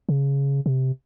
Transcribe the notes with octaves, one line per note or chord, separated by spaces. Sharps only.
C#3
C3